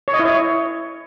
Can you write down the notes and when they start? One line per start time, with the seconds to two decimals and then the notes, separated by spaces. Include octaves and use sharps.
0.08 C#5
0.14 D#5
0.19 E4
0.25 C#5